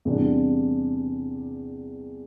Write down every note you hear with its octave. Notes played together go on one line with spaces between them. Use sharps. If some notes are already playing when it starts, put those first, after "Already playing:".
E2 C3 G3 D4